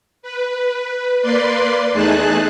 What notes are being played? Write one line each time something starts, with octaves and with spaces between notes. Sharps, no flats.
B4
A#3 B4 D5 C6
E2 A3 D#4 G#4 A5 F#6